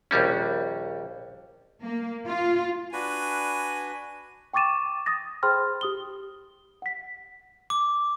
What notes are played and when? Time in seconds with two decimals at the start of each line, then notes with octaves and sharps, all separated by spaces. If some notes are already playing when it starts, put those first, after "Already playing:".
0.11 A#1 D#2 G3 C#4
1.84 A#3
2.27 F4
2.93 D4 F#4 B4 G#5
4.54 G5 C#6 D6 A6 D#7 E7
5.06 D#6 A6 A#6
5.43 G#4 C5 G5 B5 C6 F6
5.81 G4 D#6 G7
6.82 F#5 B6
7.70 D6